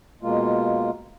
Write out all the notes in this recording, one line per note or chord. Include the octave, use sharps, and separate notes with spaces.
B2 G#3 A#3 F4